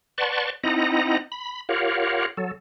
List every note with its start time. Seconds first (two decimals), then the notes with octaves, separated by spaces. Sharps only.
0.18 B4 D5 F#5 A5 C6 C#6
0.63 C4 D#4 E4 D#5 F#5 A#5
1.32 B5
1.69 F4 G4 A#4 C#5 F5 F#5
2.37 F#3 A4